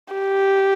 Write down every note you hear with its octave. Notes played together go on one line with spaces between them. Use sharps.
G4